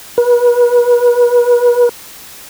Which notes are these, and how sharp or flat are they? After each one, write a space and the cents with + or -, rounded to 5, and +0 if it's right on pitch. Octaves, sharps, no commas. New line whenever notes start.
B4 -35